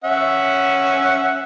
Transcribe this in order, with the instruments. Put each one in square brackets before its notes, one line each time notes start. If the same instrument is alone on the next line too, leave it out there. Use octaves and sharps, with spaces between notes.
[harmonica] C#4 E5 F#5